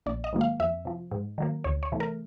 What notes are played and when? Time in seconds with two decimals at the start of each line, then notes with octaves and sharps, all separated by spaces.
0.06 A#1 D5
0.24 D#5
0.33 G#2 D#3 F#3 A#3
0.41 F5
0.60 F2 E5
0.85 C3 F3
1.11 G#2
1.38 D#3 F#3 A#3
1.64 D2 C#5
1.83 C#5
1.92 C3 E3 A3
2.00 A#4